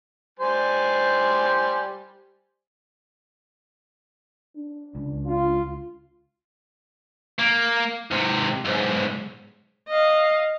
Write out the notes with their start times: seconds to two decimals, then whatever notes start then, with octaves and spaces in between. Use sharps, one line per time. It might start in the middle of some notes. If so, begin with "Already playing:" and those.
0.39 G3 C5 G#5
4.56 D4
4.95 C#2
5.26 F4
7.39 A#3
8.11 G#2 C3
8.65 B1 G#2
9.88 D#5 F5